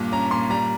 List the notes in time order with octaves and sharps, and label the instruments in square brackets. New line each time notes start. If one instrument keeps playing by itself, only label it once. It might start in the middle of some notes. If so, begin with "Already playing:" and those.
Already playing: [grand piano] G2 A#2
C#4 A#5
A#2 C6
G3 A#5